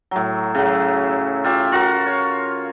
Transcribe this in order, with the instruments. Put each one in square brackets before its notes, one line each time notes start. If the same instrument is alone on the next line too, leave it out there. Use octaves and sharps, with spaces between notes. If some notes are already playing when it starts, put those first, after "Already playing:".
[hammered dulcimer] A2 F#3
C#3 F#3
F4 G4 E5
F4 F#4 A#4
C#5